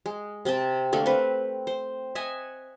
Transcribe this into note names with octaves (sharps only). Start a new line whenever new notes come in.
G#3
C3 C4 G5 A5
D3 A3 A#3
C4 B4
C5
D#5 E5 F#5 G#5